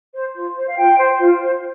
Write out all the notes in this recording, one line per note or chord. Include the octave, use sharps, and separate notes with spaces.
C5
F4
C5
F5
F4 G5
C5
F4
C5